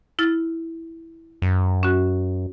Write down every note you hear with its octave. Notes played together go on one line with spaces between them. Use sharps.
E4 F6 A6
F#2
C#4 F#4